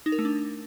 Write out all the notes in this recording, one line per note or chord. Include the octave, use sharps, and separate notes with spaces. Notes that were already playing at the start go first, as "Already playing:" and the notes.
D#4
A#4
A3
D4